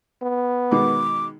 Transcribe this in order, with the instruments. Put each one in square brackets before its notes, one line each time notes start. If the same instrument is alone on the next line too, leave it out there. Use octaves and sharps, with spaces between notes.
[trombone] B3
[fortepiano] B2 D#3 G#3 [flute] D6